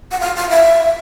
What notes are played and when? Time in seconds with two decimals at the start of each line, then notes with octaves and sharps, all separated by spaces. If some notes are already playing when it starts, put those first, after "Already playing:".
0.12 F#5
0.20 F5
0.36 F5
0.50 E5